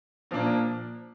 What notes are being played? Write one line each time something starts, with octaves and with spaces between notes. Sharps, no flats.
A#2 F3 A#3 D4